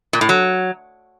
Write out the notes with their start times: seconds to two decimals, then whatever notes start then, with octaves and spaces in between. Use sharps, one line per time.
0.13 A#2
0.21 A2
0.29 F#3